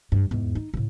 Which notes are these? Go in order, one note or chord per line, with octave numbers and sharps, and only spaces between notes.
G2
E2 G#2
D#4
A2 C#3